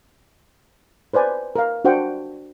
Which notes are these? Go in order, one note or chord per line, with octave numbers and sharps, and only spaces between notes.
B4 C5 D5 G#5
A#4 F5
D4 F#4 C5 F#5 G5